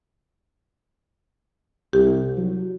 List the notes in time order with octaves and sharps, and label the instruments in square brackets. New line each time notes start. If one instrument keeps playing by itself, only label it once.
[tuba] C2 [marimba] G4
[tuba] F#3